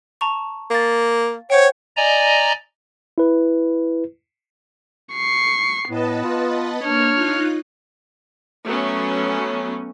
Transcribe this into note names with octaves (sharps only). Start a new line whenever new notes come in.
A5 A#5 C#6
A#3 F5 A6
C5 C#5 F#5 G5
D5 D#5 G#5 A#5
E4 B4
C#6 C7
A2 B3 B4 D#5 A5
F4
A#3 D4 C#5 F6
D#4 F4 F#6
F#3 A3 B3 C#4